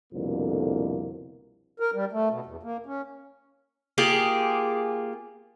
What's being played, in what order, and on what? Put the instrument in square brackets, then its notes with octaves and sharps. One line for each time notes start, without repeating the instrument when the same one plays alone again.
[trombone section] C2 F2 B2 D3 A#3
[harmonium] A#4
G3
A3
B2
E2
A#3
C#4
[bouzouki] A#3 F4 G4 G#4